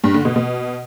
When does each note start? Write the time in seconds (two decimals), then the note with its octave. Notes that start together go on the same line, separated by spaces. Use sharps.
0.04 G2
0.14 D3
0.25 B2
0.36 B2